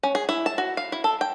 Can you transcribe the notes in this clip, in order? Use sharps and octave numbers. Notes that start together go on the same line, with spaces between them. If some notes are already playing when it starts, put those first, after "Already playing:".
C#4
G#4
E4
A5
F#4
F5
E4
A4
G5